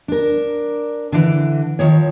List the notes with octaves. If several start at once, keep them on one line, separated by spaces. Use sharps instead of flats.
D4 A#4
D3 E3
D#3 F3 C#5